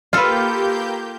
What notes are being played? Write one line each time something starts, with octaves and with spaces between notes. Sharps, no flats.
A#3 F4 G4 A4 B4 F5 G6